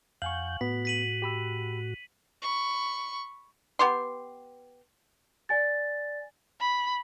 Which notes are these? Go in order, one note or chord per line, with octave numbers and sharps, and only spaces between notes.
F2 F5 F#5 G#5 C#6 G6 F#7
A2 B3 F#4 B6
B6 D#7 F#7
G4 B5 E6
B5 C#6
B3 G4 C6
D5 G#5 A6
B5